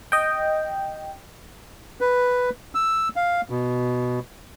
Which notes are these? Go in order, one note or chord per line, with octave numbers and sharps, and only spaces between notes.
D#5 G5
B4
E6
F5
B2